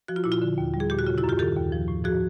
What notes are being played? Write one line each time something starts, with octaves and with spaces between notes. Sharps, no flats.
F3 F#4
F4
A#2 E4
F4
D3
D#2
G3
G#4
A#2 G4
F#4
C#3 F4
E4 F#4
F#2
F4 G4
D#3 G4 A4
D#2
F3
A2
F3 F#4 G#4